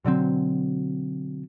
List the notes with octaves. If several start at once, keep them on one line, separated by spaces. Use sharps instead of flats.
B2 D3 F#3 C4